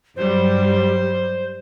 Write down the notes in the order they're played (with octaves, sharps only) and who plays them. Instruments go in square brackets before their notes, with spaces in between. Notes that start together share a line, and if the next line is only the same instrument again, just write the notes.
[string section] G2 F#3 G3 [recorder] C5